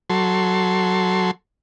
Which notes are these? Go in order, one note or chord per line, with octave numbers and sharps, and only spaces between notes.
F#3 A4 C6